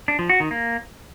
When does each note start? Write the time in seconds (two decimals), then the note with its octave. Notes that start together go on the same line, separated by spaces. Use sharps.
0.08 D4
0.19 F3
0.29 F#4
0.40 D#3
0.51 A#3